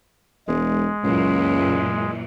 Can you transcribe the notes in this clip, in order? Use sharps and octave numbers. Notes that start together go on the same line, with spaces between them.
E1 G#3
C#2 F#2 A#2 E3